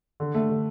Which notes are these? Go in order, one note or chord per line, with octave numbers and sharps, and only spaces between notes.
D3
A3
D3